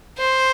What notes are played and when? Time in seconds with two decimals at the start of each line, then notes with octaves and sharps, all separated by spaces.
0.18 C5